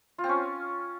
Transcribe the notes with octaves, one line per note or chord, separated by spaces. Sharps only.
F4
C4
C#4